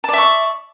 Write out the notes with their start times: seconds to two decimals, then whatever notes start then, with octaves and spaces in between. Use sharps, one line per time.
0.04 A5
0.09 D5
0.13 E5
0.18 C#6